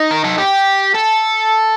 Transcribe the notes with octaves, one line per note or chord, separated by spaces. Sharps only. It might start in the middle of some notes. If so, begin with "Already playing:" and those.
Already playing: D#4
A#4
A4
G4
A4